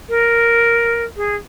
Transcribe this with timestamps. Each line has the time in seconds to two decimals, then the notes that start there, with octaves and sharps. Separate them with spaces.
0.09 A#4
1.16 G#4